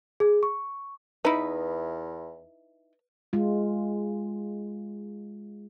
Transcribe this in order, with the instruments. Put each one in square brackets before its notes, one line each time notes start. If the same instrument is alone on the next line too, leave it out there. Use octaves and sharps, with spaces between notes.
[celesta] G#4
C#6
[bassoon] E2 [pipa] D#4 E4 [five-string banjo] B4
[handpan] G#3 F4